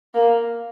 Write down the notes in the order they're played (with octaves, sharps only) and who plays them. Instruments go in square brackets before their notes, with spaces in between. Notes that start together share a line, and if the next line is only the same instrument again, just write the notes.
[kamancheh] A#3